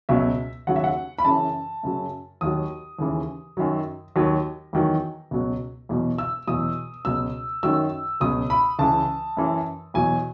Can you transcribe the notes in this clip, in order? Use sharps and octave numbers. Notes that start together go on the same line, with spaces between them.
C#2 B2 F#3 E5
D#2 C#3 F#3 F#5
E5
F#5
B5
F#2 C#3 E3 A5
F#2 C#3 F#3
D#2 D#3 F#3 D#6
D#2 C#3 E3
F#2 D#3 F#3
D#2 D#3 F#3
E2 D#3 F#3
C#2 B2 F#3
E2 B2 F#3
E6
E2 B2 F#3 D#6
C#2 B2 F#3 E6
F#2 D#3 F#3 E6
C#2 B2 F#3 D#6
B5
C#2 C#3 E3 A5
F#2 E3
E2 B2 F#3 G#5